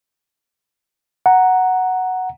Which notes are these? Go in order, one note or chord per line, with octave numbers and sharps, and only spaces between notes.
F#5 A#5